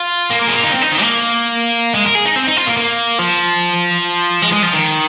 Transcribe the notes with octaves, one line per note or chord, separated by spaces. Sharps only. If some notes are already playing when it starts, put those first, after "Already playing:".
Already playing: F4
A#3
A#4
G#4
F4
D#4
C4
D#4
D#3
A#3
G#3
A#4
G#4
D#4
C4
D#4
F4
A#3
A#3
F3
G#3
G#3
F3
D#3